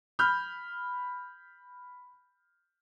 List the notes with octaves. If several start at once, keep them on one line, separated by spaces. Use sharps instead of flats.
B5 F6 G6